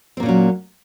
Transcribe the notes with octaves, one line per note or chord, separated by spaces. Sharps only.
A#2 F#3 A#3 C4 C#4